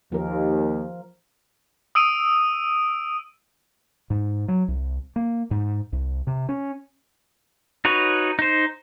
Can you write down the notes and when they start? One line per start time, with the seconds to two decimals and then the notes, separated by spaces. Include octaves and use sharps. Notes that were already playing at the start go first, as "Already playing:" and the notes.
0.12 D#2 F3 A#4
1.95 D#6 E6 D7 D#7
4.10 G#2
4.48 F#3
4.68 C2
5.16 A#3
5.51 G#2
5.92 C2
6.27 C3
6.49 C#4
7.85 D#4 F#4 B4 C#5
8.39 D#4 C5